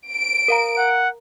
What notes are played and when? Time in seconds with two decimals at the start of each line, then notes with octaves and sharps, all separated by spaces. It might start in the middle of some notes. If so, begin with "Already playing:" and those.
0.12 D7
0.48 A#4 F5 A#5
0.78 F#5